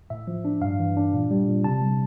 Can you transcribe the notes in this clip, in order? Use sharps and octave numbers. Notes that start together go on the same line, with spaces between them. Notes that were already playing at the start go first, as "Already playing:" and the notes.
A2 E5
F3
D4
G2 F5
E3
D4
A#2
G3
A#2
C3 A5
G3